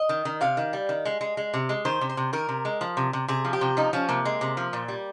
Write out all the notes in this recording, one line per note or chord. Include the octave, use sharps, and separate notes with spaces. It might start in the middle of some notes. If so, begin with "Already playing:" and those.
Already playing: D#5
D#3
D#3
C3 F5
D#3
G3
D#3
G#3
G#3
G#3
C3
G#3
D#3 C5
C3
C5
C3
D#3 A#4
C3
G#3
F3
C3
C3
C3 G#4
F3
G4
C3
F3 D#4
F3 C#4
C3 A#3
G#3
C3
F3
A#2
G3